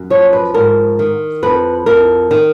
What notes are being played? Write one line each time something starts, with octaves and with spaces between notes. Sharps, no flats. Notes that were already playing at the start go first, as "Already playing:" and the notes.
Already playing: F#2
F3 C#5
B4
G#2 A#4
D#3
F2 B4
F2 A#4
D#3